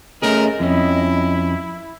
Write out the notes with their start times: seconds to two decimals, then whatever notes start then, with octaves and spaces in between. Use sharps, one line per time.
0.22 A3 C#4 G#4 A#4 D#5
0.60 F2 C#4 E4